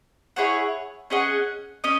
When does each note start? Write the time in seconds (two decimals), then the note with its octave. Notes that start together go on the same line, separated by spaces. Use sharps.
0.36 E4 G#4 C#5 F#5
1.10 C#4 G#4 D#5 F#5
1.84 C#4 D#5